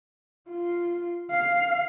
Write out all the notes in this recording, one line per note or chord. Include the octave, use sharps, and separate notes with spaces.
F4
F5